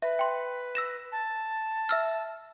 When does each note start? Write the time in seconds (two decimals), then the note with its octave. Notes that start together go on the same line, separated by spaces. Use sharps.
0.02 B4 E5
0.19 G5 C6
0.75 E6 A#6 E7
1.12 A5
1.89 E5 E6 F6